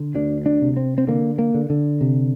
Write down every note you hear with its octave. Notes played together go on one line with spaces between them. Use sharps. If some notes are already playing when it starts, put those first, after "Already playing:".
Already playing: D3
D2 D4
D4
C3
C4
C4
D3 A#3
A#3
D3
D3
C3